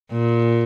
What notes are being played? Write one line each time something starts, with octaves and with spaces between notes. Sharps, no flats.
A#2